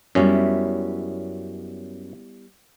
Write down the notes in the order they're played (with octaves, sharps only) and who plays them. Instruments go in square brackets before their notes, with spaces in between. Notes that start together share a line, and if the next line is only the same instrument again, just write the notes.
[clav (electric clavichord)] F#2 C#4 [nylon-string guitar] G3 B3 E4